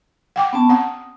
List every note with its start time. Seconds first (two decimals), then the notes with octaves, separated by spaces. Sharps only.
0.36 F#5 G5 D6
0.53 B3 C#4 A5
0.69 C4 F#5 D#6